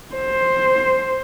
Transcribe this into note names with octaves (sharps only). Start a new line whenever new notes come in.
C5